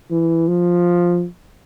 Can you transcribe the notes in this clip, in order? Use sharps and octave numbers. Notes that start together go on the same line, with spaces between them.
E3
F3